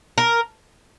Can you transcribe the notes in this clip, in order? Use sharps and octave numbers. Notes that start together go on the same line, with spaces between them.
A#4